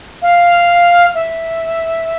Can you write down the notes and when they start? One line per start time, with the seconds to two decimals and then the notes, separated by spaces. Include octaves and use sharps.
0.22 F5
1.15 E5